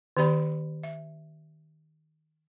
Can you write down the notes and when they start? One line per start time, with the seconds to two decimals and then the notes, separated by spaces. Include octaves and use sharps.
0.17 D#3 B3 G4 D5 B5
0.84 E5